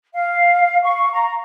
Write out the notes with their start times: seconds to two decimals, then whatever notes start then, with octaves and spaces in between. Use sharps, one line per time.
0.13 F5
0.82 C#6
1.12 A#5